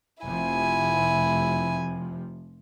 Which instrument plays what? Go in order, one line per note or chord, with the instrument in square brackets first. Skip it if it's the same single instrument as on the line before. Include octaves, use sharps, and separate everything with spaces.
[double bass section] F1 C3 F3 [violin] E4 G#5